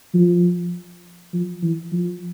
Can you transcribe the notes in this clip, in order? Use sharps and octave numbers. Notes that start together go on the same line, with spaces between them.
F3
F3
E3
F3